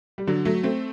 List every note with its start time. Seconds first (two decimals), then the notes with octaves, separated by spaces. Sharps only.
0.18 G3
0.27 D3 F#3
0.45 F#3 A3
0.63 A3 C4